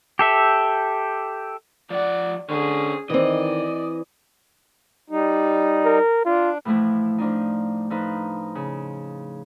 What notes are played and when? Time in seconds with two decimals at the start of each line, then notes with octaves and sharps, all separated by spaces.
0.19 G4 A4 E5
1.90 F3 D5 F#5
2.50 D3 C#4 G#4 C5
3.10 D#3 E3 C4 D5 D#5
5.10 G3 D#4
5.85 A#4
6.25 D4 F4
6.65 A2 E3 F3 A3 E4
7.18 F3 D4 D#4
7.90 F3 D#4 A4 B4
8.55 C#3